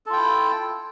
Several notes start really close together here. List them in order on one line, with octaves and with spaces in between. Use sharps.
A4 F4 G5 E4